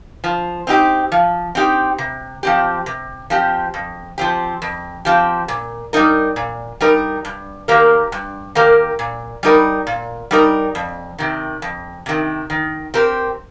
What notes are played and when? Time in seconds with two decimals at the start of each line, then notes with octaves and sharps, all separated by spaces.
0.24 F3
0.67 C4 D#4 G4
1.12 F3
1.55 C4 D#4 G4
1.98 C3
2.43 F3 C4 G4
2.86 C3
3.30 F3 C4 G4
3.74 F2
4.18 F3 C4 G4
4.62 F2
5.05 F3 C4 G4
5.48 A#2
5.93 G3 D#4 A#4
6.36 A#2
6.80 G3 D#4 A#4
7.25 G2
7.68 D#3 A#3 G4 A#4
8.12 G2
8.55 D#3 A#3 G4 A#4
8.99 A#2
9.43 G3 D#4 A#4
9.87 A#2
10.31 G3 D#4 A#4
10.75 F2
11.19 C3 D#3
11.62 F2
12.06 C3 D#3
12.50 D#3
12.94 C4 G4 A#4